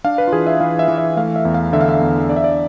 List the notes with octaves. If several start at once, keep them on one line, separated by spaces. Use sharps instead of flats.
D4 F5
B4
F4
E3 G#4
E5
E3 F5
E5
E3
E5
A3 F5
E5
E2
F5
D3 E5
F5
E5
E2
D4 D5
E5
D5